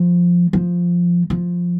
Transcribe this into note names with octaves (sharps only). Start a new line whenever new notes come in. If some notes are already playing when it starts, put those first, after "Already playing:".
Already playing: F3
F3
F3